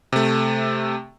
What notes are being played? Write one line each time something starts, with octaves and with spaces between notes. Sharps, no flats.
C3 A3